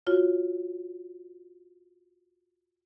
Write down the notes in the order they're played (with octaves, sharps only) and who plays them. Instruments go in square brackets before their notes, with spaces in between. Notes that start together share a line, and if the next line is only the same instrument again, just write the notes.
[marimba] F4 F#4 C#5